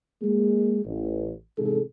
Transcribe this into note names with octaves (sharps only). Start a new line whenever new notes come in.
G#3 A#3 G#4
A1
A1 C3 G#3 D#4 G#4 A4